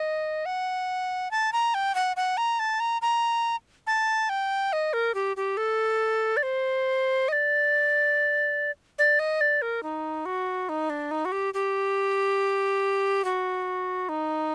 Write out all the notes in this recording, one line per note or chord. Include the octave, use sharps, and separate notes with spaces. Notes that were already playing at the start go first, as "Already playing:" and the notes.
Already playing: D#5
F#5
A5
A#5
G5
F#5
F#5
A#5
A5
A#5
A#5
A5
G5
D#5
A#4
G4
G4
A4
D5
C5
D#5
D5
D5
D#5
D5
A#4
D#4
F#4
D#4
D4
D#4
F#4
G4
G4
F#4
D#4